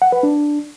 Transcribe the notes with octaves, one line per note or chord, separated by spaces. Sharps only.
F#5
B4
D4